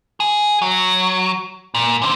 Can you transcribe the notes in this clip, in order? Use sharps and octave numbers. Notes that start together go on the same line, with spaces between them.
G#4
F#3
A#2
D3 C4